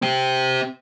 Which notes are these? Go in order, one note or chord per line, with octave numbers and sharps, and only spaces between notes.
C4 G4